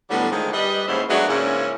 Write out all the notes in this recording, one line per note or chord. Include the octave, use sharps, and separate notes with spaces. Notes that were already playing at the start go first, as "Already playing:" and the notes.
A2 D3 F#3 G3 B3
D3 D#3 F3 G#3
G3 B4 D#5
D#2 G#2 C#4 E4 C5
F#3 G#3 A3 B3 D4 F#4
G#2 C#3 G#3 A#3 C#4 E4